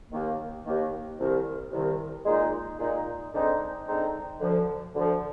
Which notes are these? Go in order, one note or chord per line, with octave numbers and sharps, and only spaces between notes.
D#2 D#3 A#3
D#2 D#3 A#3
C2 C3 D#3
C2 C3 D#3
A#2 G#3 D#4
A#2 G#3 D#4
D3 G#3 C4 D#4
D3 G#3 C4 D#4
D2 D3 F3
D2 D3 F3